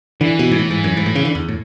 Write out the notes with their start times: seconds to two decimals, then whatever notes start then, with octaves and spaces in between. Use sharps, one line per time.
0.21 D3 E3
0.39 B2
0.51 G#2
0.59 A2
0.71 G#2
0.84 F#2
0.97 G#2
1.06 A2
1.15 C#3
1.25 D3
1.35 E2
1.49 A2